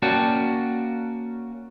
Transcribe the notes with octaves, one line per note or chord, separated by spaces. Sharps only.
A#3 C#4 F#4 D5 G5 A5